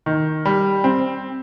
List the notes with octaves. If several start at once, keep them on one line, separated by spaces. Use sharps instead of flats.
D#3
G3
C4